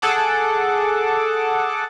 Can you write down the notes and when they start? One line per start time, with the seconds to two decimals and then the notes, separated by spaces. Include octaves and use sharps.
0.02 G#4 A4 F#5 A5 D6